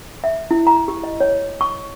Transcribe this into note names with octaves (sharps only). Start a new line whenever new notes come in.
E5
E4
A#5
G4
D#5
C#5
C#6